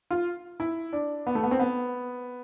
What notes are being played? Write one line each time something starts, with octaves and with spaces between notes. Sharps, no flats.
F4
E4
D4
B3
A3
B3
C4
B3